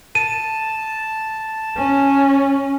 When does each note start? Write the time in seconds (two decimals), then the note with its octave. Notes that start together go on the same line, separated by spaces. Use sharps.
0.15 A5 D#7
1.77 C#4